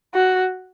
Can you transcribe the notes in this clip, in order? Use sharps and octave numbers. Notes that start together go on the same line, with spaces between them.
F#4